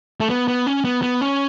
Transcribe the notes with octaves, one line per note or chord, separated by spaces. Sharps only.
A3
B3
B3
C#4
B3
B3
C#4